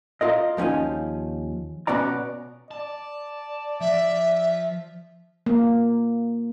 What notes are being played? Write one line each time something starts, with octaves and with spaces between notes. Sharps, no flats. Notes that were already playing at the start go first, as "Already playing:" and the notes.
F4 A#4 D#5
D#2 F3 C#4 D#4 G#5
B2 B3 C#4 D5 A#5
D5 A5
F3 E5
A#3